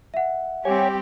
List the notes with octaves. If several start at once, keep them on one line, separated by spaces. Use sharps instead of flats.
E5 F#5
G3 C4 G4 C#5 G#5